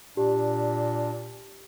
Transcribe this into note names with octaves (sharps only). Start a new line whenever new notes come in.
A#2 D4 G4